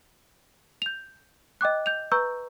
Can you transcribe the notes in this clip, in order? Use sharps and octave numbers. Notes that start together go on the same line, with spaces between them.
G6 F7
D#5 G5 D6 F#6
G6 F7
B4 A#5 C#6 E6 G6